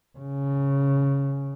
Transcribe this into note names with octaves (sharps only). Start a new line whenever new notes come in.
C#3